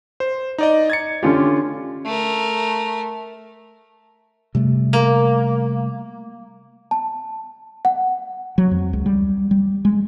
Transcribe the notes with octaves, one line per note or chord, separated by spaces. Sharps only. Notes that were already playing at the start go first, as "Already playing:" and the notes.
C5
D#4 D5 D#5
G#6 A6 C#7
D3 C#4 F4 G4
A3 A#4
C3 G3 A3
A#3
A5
F#5
F#3
F2
C#2
G3
G3
G#3